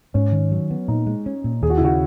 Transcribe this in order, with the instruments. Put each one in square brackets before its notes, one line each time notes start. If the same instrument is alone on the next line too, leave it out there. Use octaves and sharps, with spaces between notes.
[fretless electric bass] G#2 [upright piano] C#4
[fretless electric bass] D#3
F#3
B3
[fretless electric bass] A#2 [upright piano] D#4
[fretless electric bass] G#3
C#4
A#2
[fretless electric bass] D#2 [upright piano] G#4
[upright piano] F#4
E4
[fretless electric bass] C#3 [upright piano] F#4